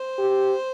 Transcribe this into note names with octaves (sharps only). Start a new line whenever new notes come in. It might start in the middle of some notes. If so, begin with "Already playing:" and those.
Already playing: C5
G4